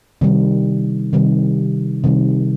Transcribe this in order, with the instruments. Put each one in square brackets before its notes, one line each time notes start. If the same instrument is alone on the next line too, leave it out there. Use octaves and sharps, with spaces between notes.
[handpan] C3 D#3 G3
C3 D#3 G3
C3 D#3 G3